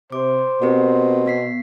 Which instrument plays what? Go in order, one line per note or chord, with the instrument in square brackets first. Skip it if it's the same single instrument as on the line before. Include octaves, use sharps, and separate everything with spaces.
[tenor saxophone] C3 [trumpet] C5 [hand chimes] D6
[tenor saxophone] B2 [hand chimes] C4 G4 A#4
[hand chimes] B3 B6 C7